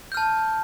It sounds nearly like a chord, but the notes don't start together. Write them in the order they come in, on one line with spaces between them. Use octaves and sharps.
G6 F6 A5